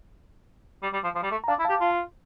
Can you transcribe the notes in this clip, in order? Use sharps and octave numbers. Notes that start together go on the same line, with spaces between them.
G3
G3
F3
F3
G3
A3
A#5
D4 F5 A5
E4
G4 F5 A5
F4